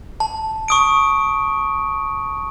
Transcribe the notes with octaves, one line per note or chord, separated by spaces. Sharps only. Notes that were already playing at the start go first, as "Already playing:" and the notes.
A5
C#6 D#6 D7